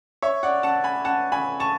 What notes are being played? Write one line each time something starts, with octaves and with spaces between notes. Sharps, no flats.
C#5 E5
D5 F#5
F#5 A5
G#5 B5
F#5 A5
G#5 B5
A5 C#6